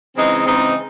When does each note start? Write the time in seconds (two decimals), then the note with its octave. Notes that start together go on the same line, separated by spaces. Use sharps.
0.16 C#3 E3 G#3 C4 D#4
0.46 C#3 E3 G#3 C4 D#4